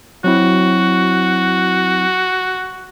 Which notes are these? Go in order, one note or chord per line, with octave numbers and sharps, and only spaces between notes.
F#3 C4 E4 F#4